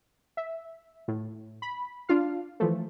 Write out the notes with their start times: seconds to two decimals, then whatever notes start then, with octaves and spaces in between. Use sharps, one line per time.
0.37 E5
1.08 A2
1.62 B5
2.09 D4 F4 F5
2.60 E3 F3 A3